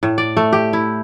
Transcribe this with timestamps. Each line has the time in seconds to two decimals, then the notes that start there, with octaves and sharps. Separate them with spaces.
0.03 A2
0.18 D5
0.37 A3
0.53 G4
0.73 E4